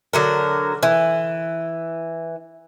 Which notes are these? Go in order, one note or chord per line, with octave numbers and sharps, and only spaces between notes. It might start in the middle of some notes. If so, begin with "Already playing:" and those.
D3 F#3 A#4
E3